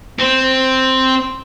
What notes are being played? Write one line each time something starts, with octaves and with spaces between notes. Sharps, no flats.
C4